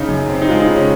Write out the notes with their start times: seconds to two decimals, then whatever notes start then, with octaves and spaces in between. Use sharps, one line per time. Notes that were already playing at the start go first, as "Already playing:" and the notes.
Already playing: C#3 D#4
0.08 F#2
0.29 C4
0.42 D#4
0.49 G#3 F4
0.62 D#4
0.69 C#3
0.76 C#4